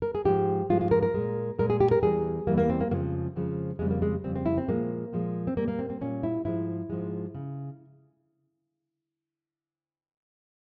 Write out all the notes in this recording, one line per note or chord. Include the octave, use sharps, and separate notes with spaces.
A#4
G#4
G#2 F3 G#3 G4
G#2 F3 G#3 F4
F4
A#4
A#4
A#2 G#3
A#2 G#3 A#4
G#4
G4
A#4
E2 E3 G3 G#4
E2 E3 G3 A#3
A#3
C4
A#3
F2 C#3 F3 G#3 A#3
F2 C#3 F3 G#3
F2 C#3 G3 G#3
A#3
G#3
F2 C#3 G3 C4
C4
E4
C4
A#2 F3 G#3 A#3
A#2 F3 G#3
C4
A#2 G3 A#3
A#3
C4
C4
A#2 G3 C#4
E4
G#2 F3 G#3 E4
G#2 F3 G#3
C#3